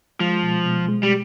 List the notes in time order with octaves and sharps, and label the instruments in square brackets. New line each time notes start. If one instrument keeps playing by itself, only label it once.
[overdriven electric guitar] F3 [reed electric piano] G#3
[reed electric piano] B2
B2
G#3
[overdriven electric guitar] G3